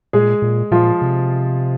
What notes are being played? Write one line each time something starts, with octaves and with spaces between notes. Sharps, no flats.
A#2 G#3 G#4
A#2
A#2 F3 F4
C3